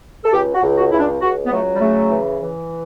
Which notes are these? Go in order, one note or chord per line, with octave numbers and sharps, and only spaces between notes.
A4
C#2 G4
F#4
C#2
F#4
C#2 E4
D4
C#2 F#4
B3
F#3 A3
G3
C#3 A3
E3
E3